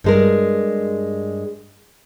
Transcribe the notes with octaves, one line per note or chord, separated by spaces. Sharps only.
G2 G#3 A#4